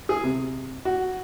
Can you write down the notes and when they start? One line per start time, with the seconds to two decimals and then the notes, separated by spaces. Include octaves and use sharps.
0.09 G#4
0.24 C3
0.85 F#4